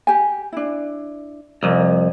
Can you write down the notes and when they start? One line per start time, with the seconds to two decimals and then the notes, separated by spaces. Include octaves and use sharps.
0.07 G4 G#5
0.53 D4 E4
1.63 C2 F2 A#4